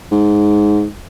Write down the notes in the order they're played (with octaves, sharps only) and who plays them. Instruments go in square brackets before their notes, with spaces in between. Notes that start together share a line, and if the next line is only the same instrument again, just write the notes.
[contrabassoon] G#2